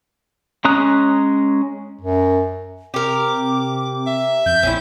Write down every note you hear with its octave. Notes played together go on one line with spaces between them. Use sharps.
G#3 C#4 A#5 D#6 F#6
F#2
C3 G4 A#4 D6
E5
F2 G6
A#1 C4 C#4 E4